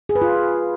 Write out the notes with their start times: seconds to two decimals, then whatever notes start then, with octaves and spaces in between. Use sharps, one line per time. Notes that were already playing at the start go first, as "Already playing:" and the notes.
0.09 G#4
0.15 B4
0.22 F4